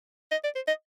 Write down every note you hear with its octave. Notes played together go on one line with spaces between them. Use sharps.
D#5
D5
C5
D#5